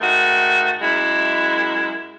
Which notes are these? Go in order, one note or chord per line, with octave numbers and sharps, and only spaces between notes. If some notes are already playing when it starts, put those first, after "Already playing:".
G#2 D#3 A3 F#4
F#2 G#3 E4